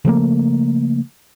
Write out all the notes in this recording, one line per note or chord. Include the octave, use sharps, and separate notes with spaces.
C#3 F3 A3 A#3